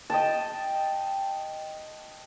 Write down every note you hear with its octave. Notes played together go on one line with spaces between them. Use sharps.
D#5 G5 A5